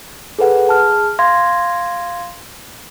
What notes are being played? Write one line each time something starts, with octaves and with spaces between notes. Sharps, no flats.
G#4 A4 B4 F#5
G#4 A5 F6
F5 C6 G#6 A#6